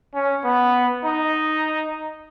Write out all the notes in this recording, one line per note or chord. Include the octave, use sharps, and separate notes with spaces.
C#4
B3
D#4